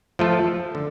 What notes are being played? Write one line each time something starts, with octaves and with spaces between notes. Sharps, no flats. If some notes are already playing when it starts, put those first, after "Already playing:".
F3 A3 F4 A4
D3